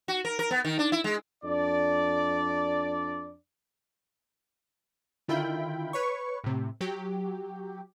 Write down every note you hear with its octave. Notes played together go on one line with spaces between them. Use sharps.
F#4
A#4
A#4
B3
D#3
D4
E4
G#3
F2 D4 D5
D3 D#3 E4 F4 G5 B5
B4 C#5 C#6
A2 C3
F#3 G4